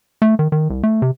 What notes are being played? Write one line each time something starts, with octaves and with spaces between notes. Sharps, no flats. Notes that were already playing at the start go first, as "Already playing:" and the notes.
A3
D#3
D#3
C2
A3
C3